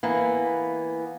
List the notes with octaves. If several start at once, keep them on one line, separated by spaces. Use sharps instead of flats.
E3 A#3 B3